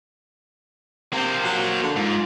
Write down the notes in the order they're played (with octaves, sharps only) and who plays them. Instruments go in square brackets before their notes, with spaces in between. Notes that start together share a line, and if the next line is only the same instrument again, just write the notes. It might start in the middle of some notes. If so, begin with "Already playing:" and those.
[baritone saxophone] C3 [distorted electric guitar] A#3 C5
[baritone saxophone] F#3
D3
[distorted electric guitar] G#2 [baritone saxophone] F4